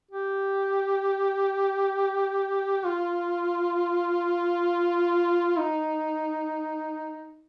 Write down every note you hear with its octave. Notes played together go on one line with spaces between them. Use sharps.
G4
F4
D#4